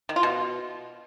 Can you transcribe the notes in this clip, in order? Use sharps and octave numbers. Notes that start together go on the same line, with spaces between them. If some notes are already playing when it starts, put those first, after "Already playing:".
D#3
F4
B2